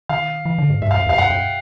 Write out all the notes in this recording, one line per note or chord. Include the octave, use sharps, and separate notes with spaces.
D#3 F5
E3
D3
G#2
G2 E5
F5
F#2
E2 F5
F2
F#2 F#5
F#2 G5